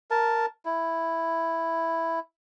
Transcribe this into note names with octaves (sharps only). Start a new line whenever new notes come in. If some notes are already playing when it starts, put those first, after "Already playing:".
A#4 A5
E4